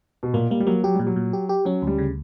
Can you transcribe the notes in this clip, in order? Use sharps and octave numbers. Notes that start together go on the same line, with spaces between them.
B2
A#2 A#3
G3 A#3
G3
F#3 A#3
F#3 G4
A#2 G3
F#3
A#2
G4
G4
F#3 C#4
D2 G3
C#3